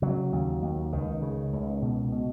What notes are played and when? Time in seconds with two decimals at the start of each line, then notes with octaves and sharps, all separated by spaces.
0.02 C#3 F#3
0.32 D#2
0.62 D#2
0.93 C#2 D#3
1.22 C#3
1.53 C#2
1.82 B2
2.12 B2